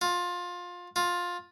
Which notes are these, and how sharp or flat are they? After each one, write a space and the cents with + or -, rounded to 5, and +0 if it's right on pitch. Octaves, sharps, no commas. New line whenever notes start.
F4 +20
F4 +15